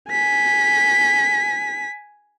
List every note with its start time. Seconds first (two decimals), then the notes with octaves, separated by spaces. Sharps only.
0.10 G#5 B6